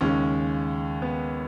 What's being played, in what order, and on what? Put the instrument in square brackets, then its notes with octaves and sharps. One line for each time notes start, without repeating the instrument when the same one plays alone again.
[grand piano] D#2 C#3 G#3 C#4
B3